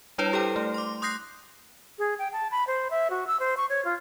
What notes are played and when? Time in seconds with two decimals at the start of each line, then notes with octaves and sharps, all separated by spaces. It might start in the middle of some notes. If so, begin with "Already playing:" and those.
0.18 G3 D4 E4 B4 C#5
0.33 G4 A4 C5 G5
0.56 A3
0.74 C6 D6
1.02 C6 D#6 F#6 G6 A#6 C7
1.99 G#4
2.19 G5
2.33 A5
2.51 B5
2.67 C5
2.91 E5
3.10 F#4
3.27 E6
3.40 C5
3.57 C#6
3.69 C#5
3.85 F4